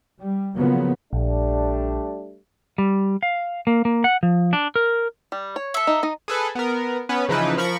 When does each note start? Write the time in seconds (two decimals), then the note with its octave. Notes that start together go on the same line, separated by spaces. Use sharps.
0.20 G3
0.58 C#3 F3 F#3 A#3 B3
1.13 A#1 G3 A3 D4
2.78 G3
3.23 F5
3.67 A#3
3.85 A#3
4.04 F#5
4.23 F3
4.53 D4
4.76 A#4
5.32 G3
5.56 C#5
5.74 A4 E5
5.87 D#4
6.03 D#4 D#5
6.28 G#4 A4 B4
6.55 B3 A#4
7.09 B3 C#4 B4
7.29 C#3 E3 F3 D#4 E4 B4
7.57 F3 A#4 B5 C#6